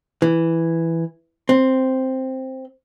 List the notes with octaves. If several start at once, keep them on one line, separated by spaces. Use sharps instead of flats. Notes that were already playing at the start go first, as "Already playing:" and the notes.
E3
C4